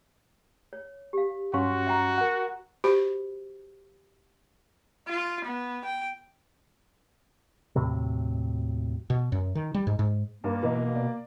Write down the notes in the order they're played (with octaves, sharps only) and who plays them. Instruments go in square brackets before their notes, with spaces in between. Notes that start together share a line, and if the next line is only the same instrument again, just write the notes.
[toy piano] C#5
G4 F5
[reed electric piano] G2 F#3 C#4 [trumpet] F#4 [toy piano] F5 C6 C#6
[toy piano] E5 G5 A#5
[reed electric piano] A#4 F#5
[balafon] F#4 G4 C5 B5
[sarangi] F4
B3
G5
[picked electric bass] D#2 A2 C3 F#3
[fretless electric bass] B2
F#2
D#3
G3
G#2
G#2
[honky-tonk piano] G2 A#4 [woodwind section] A#3
[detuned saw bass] B2 [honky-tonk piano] E3 D#4
[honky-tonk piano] D5